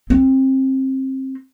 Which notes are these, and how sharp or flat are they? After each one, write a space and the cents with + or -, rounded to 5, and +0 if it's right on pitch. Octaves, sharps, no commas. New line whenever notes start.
C4 +25